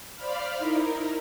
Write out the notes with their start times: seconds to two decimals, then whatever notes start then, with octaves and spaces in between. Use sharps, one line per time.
0.15 C5 D5 F5 B5 F6
0.57 D#4 E4 A#4